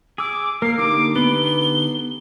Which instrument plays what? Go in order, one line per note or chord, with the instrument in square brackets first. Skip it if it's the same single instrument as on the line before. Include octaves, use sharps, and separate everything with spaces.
[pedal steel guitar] G#4 E6 [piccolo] D6
[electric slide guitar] A#3 [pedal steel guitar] A#4 [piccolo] C7
[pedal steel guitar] D3 D#4 G4 [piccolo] D6
[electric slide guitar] B3 B4 [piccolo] G7